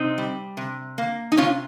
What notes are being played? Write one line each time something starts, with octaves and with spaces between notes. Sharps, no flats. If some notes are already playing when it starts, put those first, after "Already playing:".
Already playing: C3 C4 D#4
G3
C3
A#3
D#4
C3 C#4 F4